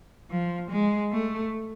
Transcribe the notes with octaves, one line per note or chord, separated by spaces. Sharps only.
F3
G#3
A3